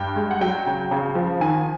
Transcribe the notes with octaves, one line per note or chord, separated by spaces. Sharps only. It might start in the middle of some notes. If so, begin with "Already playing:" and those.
Already playing: G2 G5
G#3
F#5
F#3 G5
C#3
C#3
F3
D#3 G#5